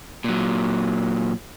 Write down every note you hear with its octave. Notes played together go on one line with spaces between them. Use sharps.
A#2 F#3